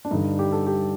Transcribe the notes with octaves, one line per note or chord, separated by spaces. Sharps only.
D4
G2 D3 D#4
G4
A4
G4